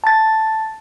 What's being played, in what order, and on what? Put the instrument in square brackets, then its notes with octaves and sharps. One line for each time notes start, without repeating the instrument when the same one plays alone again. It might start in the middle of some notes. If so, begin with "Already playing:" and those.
[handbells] A5 A6